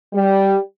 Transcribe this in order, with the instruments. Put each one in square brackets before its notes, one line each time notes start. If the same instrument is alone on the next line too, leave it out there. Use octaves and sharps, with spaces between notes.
[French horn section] G3